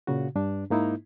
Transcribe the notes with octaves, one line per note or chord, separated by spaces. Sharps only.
A#2 C#3 F#4
G2 D4
G#2 A#3 D#4 E4